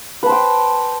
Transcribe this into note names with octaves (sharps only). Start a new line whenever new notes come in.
B4 C5 G5 A5